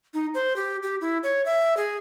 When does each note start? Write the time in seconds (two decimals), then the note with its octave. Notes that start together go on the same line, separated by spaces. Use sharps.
0.14 D#4
0.34 C5
0.56 G4
0.83 G4
1.01 E4
1.23 C#5
1.45 E5
1.77 G#4